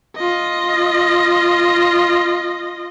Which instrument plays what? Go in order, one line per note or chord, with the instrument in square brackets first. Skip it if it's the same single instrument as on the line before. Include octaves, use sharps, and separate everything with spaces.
[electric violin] F4 D#5